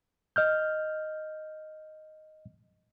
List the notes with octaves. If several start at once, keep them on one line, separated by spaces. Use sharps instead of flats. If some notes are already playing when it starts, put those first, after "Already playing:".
D#5 F6 G6